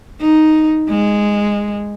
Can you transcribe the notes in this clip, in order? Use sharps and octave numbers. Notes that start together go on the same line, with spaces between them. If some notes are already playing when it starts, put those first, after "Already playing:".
D#4
G#3